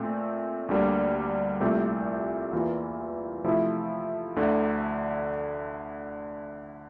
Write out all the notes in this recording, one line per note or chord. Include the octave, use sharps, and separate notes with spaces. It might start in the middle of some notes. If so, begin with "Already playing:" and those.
Already playing: A#2 A3 C4
D2 D3 G3 A#3
C2 A#2 A3 C4 G4
E2 E3 A#3 F4
C3 F3 A3 E4
D2 D3 A3